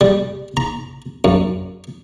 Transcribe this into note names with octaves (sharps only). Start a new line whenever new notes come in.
G3
A#5
F#2